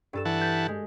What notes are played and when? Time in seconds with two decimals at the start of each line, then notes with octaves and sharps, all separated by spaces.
0.13 G2 A4 E7
0.25 E3 F#5 A5
0.41 G6 A6 B6
0.68 G#3